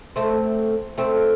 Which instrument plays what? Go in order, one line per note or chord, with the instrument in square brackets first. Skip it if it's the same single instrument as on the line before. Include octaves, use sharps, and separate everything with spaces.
[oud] A3 C4
A3 C4